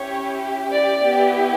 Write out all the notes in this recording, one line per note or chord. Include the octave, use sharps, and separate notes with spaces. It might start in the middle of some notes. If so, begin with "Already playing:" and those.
Already playing: C#4 E4 G4 C#5
D5
B3 E4 G4